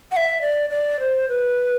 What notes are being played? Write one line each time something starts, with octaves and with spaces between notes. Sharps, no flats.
F#5
E5
D5
D5
C5
B4